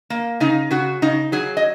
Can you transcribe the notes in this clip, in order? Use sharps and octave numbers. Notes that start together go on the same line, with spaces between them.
A#3
C#3 D#4
C#3 F#4
C#3 D#4
F#3 G#4
D#5